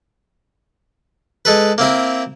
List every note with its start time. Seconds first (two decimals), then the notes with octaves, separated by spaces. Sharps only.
1.45 G#3 A4 B4
1.78 A#3 C4 E4 A#4